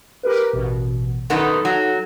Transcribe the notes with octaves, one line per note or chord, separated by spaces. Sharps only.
G4 A#4 B4
A1 B2
F#2 D#3 B3 D#4 A4
F#3